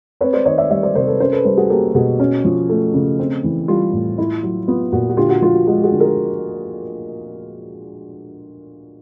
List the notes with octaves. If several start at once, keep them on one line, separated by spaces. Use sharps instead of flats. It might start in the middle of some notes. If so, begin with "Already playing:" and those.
C4 B4 C#5
C5 D5
D#3 C#5 D#5
D5 E5
G3 D5 E5
C5 D5
C3 A#4 C5
A4 B4
C#4 A#4 C5
A4 B4
G3 A#4 C5
F#4 G#4
A#3 G4 A4
B2 F#4 G#4
C#4
F3
A3
C#3
C4
E3
G3 F4
A2
E4
F#3
B3 F4
A#2 F#4
F#4
D3 F4 G4
F#4
F3 F4
F#4
G#3 F#4
F#4 G#4
D3
G#4 A#4